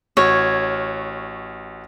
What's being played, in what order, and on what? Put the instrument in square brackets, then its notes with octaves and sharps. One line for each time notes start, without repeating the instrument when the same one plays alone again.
[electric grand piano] A1 F#4 F6 [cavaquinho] C#5